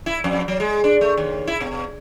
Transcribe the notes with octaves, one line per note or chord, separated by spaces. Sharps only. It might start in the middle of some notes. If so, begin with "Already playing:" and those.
E4
F2
F#3
G#3
D4
A3
D#2
E4
B2